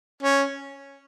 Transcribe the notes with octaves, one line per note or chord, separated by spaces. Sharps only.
C#4